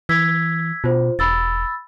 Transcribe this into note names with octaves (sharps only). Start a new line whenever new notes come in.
E3 E6 G#6 B6
B2 F4 C5
E1 B5 E6 A6